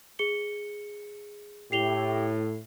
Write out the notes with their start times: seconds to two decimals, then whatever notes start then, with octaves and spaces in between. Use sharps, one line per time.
0.19 G#4 C#7 G7
1.72 A2 G4 C7 F7 G7